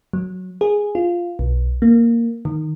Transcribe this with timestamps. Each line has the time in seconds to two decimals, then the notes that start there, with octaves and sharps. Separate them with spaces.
0.13 F#3
0.61 G#4
0.95 F4
1.39 B1
1.82 A#3
2.45 D#3